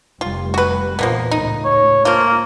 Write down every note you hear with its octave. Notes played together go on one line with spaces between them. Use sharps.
F1 G3 F4
F#4 B4
E2 A#2 F3 A#3 B3
C#2 A2 D#4
C#5
F3 A#3 F4